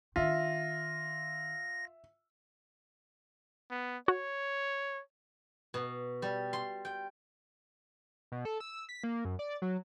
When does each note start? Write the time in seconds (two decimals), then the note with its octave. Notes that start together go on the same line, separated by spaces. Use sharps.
0.16 D#3 D4 F4 E5 A#6
3.71 B3
4.08 F#4 C#5
5.74 B2
6.22 G3
6.53 C6
6.85 G5
8.32 B2
8.45 A4
8.60 E6
8.89 B6
9.04 A#3
9.25 F#2
9.39 D5
9.62 F#3